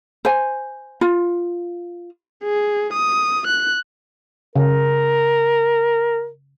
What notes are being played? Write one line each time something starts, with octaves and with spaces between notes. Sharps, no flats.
C5 G#5
F4
G#4
D#6
F#6
C#3 A#4